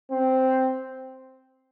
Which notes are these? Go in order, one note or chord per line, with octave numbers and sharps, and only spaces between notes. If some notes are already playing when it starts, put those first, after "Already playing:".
C4